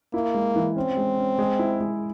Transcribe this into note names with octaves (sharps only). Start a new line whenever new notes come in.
A#3 E4
G#3
E3
C4 C#4
G#3
C#4
G#3
E4
G#3